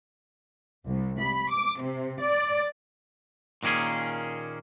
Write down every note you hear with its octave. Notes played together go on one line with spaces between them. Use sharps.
C2
B5
D6
C3
D5
A#2 D#3 A#3 C#4 G#4